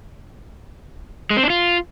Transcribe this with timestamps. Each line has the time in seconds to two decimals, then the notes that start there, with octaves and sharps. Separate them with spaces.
1.30 G#3
1.37 C4
1.43 D4
1.50 F4